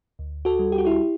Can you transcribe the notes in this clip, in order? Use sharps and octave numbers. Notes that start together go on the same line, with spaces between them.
D2
F#4 A4
G3
G4
F#4
E4 G4